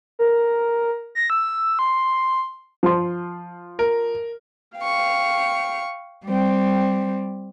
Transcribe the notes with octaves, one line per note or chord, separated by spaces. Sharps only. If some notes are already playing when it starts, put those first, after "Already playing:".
A#4
A#6
E6
C6
F3 C6
A#4
F5 G5 C#6
G3 C4